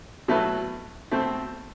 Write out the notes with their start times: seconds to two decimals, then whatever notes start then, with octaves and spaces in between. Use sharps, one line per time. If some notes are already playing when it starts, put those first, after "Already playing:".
0.28 B2 F#3 A3 E4 B4
1.11 B2 A3 C4